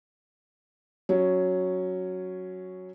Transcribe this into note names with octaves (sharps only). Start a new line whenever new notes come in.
F#3 C#4